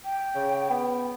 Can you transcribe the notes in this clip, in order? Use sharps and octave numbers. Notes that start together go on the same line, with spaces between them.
G5
C#3
B3